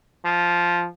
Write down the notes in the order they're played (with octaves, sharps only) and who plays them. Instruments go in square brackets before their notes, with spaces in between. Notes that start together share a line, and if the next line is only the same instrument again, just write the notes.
[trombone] F3